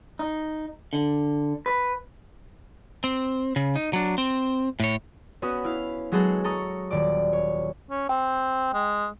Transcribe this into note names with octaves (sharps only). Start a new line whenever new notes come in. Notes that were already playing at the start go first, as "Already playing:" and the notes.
D#4
D3
B4
C4
C#3
D#4
F#3 D4
C4
A2 C#5
B3 C#4 F#4 B5 D#6
E4 F5
F#3 G#3 B3 F#4 G#4 A4
A4 A#5 C#6 D#6
D#1 D5 D6
C#5
C#4
C4 G5
G#3